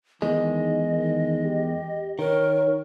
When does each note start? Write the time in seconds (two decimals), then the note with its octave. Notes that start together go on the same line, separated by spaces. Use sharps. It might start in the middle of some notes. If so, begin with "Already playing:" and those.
0.22 E2 D#3 G#3 D#5
0.90 D#3
1.44 G4
2.19 D#3 A#4 C#5